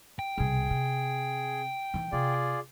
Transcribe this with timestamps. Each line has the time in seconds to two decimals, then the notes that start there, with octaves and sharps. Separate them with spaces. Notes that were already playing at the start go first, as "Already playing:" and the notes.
0.19 G5
0.38 C2 B2 G#4
0.70 C3
1.94 D#3 E3
2.12 C3 F4 G#4 D5